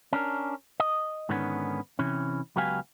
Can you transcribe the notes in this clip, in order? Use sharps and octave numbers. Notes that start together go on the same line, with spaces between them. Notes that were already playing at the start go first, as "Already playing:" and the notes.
C#4 D4 A#4
D#5
G#2 D3 D#3 G3 B3 C#4
C3 E3 C#4
C#2 F#3 B3 G4 F5 G#5